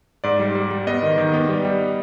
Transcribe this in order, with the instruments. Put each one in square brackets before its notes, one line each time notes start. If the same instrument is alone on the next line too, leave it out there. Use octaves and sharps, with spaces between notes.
[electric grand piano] G#2 D5
G3
G3
G3
B3 D#5
D#3
D#3
B3
G3
G3